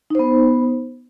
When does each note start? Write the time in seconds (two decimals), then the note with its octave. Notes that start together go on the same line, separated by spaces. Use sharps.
0.10 D#4
0.15 C5
0.19 B3